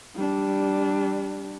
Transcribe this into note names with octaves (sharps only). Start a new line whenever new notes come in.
G3 D4